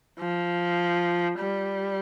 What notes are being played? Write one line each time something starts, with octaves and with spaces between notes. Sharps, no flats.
F3
G3